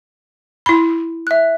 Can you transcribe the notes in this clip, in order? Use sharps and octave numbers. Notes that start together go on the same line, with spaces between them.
E4 B5
E5 F#6